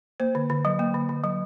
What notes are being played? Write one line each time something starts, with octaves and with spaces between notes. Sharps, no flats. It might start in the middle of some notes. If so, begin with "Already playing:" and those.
A#3 C5
D3
D3
F#3
A#3
D3
D3
F#3